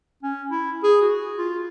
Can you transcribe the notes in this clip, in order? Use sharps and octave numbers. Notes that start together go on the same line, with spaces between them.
C#4
E4
G#4
F#4
F4